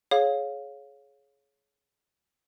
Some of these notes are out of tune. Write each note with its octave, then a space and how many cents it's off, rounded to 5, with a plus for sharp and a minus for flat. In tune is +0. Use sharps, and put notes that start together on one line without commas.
G#4 +25 C#5 +0 F5 +15